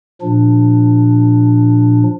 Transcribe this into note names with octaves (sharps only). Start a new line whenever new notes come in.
A#2 F3 D4